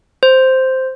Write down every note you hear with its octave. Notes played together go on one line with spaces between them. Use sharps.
C5